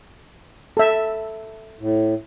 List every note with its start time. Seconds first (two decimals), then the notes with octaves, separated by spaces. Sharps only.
0.77 A4 E5
1.80 A2